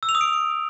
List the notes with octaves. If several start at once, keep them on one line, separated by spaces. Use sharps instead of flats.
E6
F7
D#6
D7